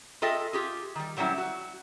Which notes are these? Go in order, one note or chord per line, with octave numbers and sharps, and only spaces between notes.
F4 G#4 A4 D#5 E5 G5
F4 G4 G#4
D#3 G3
A#2 F#3 G3 C#4 E4
F#4